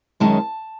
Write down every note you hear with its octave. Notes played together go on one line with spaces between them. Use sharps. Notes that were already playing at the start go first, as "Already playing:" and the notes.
F#2 D#3 G#3 C#4 A5